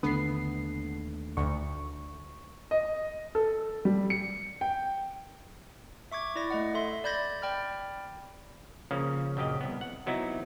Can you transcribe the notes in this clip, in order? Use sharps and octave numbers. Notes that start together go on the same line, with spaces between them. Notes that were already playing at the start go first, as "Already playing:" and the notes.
D#2 D3 A3 B3 D4 C7
D2 C#6
D#5
A4
G3
C#7
G5
E5 C#6 D6 G#6
E4 D5 A#6
A3 D#5 F#5
A4 E5 C6
D5 B5 G6 G#6 A#6
D5 G5 B5 F6
C#3 F3 A#3 C#4
A#1 F#2 C#3 G4 D#5
C2 B3
F#5
C3 F#3 B3 D#4 E4